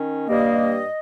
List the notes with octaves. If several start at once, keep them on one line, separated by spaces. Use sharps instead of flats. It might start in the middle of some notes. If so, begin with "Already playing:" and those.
Already playing: D#3 C#4
G2 G3 A#3 D#5